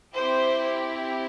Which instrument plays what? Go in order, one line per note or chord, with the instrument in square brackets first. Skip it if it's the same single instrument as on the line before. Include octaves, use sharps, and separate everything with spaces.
[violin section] C4 E4 G4 C5